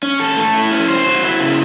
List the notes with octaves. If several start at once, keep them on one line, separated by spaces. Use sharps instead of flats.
C#4
A4
A3
E4
C#4
C5
F#3
E4
C#3